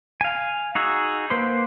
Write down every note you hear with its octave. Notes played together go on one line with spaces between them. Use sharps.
F5 G#5
D#4 F#4 G#4 E6
A#3 B4 C5 C6